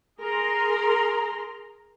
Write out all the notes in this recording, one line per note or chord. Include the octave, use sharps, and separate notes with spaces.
G#4 A#4 A#5 C6